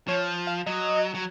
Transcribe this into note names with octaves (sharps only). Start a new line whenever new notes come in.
F3 C#5
F5
F#3 D#5
F#3